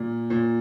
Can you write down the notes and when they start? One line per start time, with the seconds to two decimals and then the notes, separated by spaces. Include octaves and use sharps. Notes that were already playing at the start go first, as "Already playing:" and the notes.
Already playing: A#2
0.30 A#2